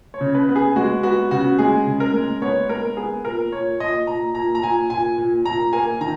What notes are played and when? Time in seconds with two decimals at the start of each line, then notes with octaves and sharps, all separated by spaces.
0.14 C#5
0.21 C#3
0.35 B4
0.49 B3
0.56 G#4
0.76 G#3 F#4
1.03 B3 F#4
1.31 C#3 F#4
1.58 G#3 G#4
1.87 C#3
2.00 A#4
2.14 G#3
2.42 B3 C#5
2.69 G#3 A#4
2.97 B3 G#4
3.25 A#2 A#4
3.52 A#2 C#5
3.80 A#2 D#5
4.07 A#2 A#5
4.35 A#2 A#5
4.55 A#5
4.63 A#2 G#5
4.90 A#2 G#5
5.18 A#2
5.45 A#2 A#5
5.73 A#3 G#5
6.01 D#3 A#5